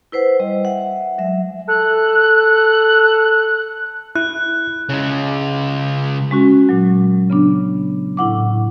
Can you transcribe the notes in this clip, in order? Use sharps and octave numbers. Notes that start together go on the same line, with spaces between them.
E4 B4 C5 F#5
G3 D#5
E5 F#5
F#3 G#3 E5
A4 F#6
E4 F#6
C#3 G#3
G#3 C#4 F#4
A#2 F#3
C#3 B3 D4
A2 E4 F#5 D6